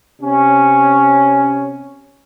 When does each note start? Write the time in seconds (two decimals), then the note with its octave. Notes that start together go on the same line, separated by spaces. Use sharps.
0.21 C3 C#4